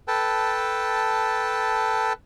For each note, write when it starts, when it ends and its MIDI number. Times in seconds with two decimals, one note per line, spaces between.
0.08 2.13 69
0.08 2.13 71
0.08 2.13 79
0.08 2.13 81